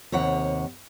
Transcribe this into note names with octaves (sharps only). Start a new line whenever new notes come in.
D#2 C3 C#5 F#5